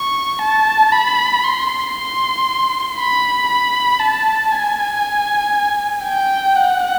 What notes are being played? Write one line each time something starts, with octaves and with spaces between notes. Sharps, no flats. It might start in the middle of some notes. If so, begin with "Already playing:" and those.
Already playing: C#6
A5
B5
C6
C6
B5
B5
A5
G#5
G5
F#5